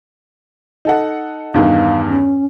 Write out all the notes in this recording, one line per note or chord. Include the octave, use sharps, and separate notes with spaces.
D#4 A4 F#5
E2 G2 D#3 F5
C#4